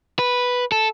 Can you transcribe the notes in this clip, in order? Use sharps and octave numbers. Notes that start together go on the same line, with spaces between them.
B4
A4